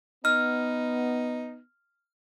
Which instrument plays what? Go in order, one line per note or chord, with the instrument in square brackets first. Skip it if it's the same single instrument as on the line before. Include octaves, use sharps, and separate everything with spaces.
[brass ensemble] B3 [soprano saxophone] D#4 [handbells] F6